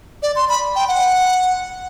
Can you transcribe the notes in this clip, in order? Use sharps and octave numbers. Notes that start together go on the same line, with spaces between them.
D5
C6
B5
G5
F#5